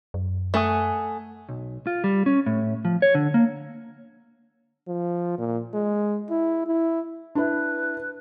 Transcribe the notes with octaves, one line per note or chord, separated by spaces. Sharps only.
F#2
A3 F#5 G#5 D#6
B1
F4
G3
C#4
A2
F3
C#5
D3
A#3
F3
A#2
G#3
E4
E4
D4 E4 B4